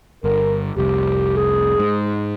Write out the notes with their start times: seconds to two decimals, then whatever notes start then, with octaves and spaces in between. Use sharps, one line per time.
0.24 G1 A#4
0.77 F1 C2 G4
1.37 G#4
1.80 G#2